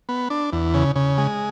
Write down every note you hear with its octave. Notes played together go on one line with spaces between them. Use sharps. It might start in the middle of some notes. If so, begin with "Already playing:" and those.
B3
D4
E2
C#3
C#3
G#3